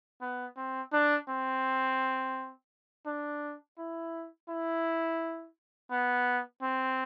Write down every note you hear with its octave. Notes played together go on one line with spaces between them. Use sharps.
B3
C4
D4
C4
D4
E4
E4
B3
C4